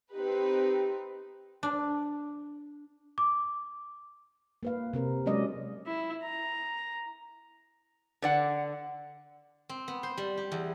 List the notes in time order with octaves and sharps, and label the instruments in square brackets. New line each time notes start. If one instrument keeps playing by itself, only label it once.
[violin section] C4 D#4 B4 [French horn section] G4
[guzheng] D4
[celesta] D6
[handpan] A#3 B4 F5
C3 C4 A#4
F#3 G#3 C#4 D5 D#5
[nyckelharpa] E4
A#5
[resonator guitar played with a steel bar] D3 D5 F#5
[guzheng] C4
B3
C5
G3
G4
E2